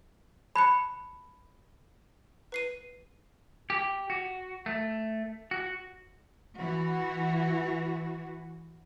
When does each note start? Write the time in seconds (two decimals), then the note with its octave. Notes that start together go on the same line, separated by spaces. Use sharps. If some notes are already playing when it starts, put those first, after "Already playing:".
0.55 A5 B5 F#6 C#7
2.52 B4 C7 D#7
3.70 G4
4.10 F#4
4.66 A3
5.51 F#4
6.57 E3 F#4